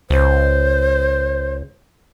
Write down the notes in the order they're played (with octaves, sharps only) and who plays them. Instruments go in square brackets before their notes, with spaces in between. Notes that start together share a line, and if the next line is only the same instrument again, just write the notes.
[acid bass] C#2 [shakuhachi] C5